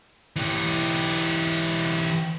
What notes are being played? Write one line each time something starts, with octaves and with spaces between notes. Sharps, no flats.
E3 G4